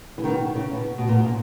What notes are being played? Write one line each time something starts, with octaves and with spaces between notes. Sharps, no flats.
E3
B2 D#3
C#3
B2
B2
A#2
A#2